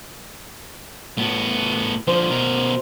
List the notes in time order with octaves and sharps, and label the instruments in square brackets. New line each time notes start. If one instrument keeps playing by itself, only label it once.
[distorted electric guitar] A2 B3
[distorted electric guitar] D3 F3 [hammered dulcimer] C5
[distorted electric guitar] B2 A#4